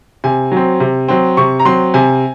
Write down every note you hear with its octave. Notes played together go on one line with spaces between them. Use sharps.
C3 G#5
F#3 C4
C3
F#3 C4
C3 C#6
A#5
F#3 C4 C6
C3 G#5